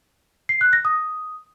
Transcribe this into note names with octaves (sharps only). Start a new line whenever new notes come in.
C7
F#6
A#6
D#6